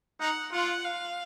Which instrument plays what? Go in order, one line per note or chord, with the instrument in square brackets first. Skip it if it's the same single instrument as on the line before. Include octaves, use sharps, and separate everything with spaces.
[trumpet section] D#4 [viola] F#5
[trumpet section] F4 [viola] F#5
[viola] F5